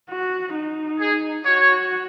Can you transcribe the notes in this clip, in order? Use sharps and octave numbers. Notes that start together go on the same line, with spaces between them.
F#4
D#4
G#4
F#4 C#5